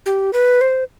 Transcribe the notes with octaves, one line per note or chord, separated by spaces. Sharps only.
G4
B4
C5